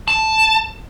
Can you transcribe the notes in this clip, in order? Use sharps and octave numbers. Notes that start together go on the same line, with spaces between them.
A5